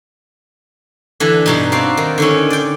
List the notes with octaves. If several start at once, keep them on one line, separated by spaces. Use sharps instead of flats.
D3 E3
G2 B2 D#4
C4 F#4 D5 F5
D#3
D3 D#3 C#4
D5 G5